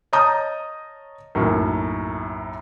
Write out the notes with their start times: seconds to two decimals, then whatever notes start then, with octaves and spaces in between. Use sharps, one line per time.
0.13 C#5 D#5 A5 A#5 D#6 G6
1.35 B1 F#2 A2 A#3